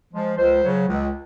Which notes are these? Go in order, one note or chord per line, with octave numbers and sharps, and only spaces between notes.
F3 G#3
C#2 C5
C#3 F#3
C#2